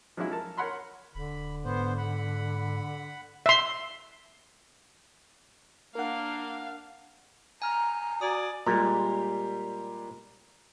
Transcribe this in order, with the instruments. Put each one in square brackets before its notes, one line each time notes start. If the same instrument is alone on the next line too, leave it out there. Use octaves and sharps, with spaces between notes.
[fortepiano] F3 F#3 G#3 C#4 E4
A4 A#4 A5
A#4 C#5 F#5 B5 C6
[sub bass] D#1 [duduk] D3 [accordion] B5
[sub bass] G#2 [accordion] B3 C5
[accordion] F#5 B5
[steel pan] E5 C6
[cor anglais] A#3 [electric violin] D4 F5 [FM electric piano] A#4 F#5
[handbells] G#5 F6 [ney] A#5
[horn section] F#4 D5 G#5 [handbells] D#6
[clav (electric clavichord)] A#2 [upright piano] G3 G#3 G4 [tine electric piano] A#5